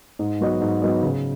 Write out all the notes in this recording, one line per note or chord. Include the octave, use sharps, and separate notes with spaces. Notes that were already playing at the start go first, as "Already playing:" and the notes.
G#2
F#3 B3 F#4 D#5
G#2
F#3 B3 F#4 D#5
C#3